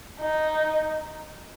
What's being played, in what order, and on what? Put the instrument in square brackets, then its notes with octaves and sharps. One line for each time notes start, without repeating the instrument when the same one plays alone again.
[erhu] D#4